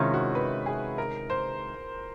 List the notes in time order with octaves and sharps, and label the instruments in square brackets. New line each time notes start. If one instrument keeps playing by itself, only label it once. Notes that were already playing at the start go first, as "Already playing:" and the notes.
Already playing: [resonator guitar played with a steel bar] C3 D#3 G#3 C#4 [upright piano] E4 F4
[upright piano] F#4
B4
G#4
A#4
C5